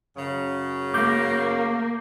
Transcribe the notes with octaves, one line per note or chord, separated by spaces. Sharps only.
F#2 C#3
A#3 D6 G6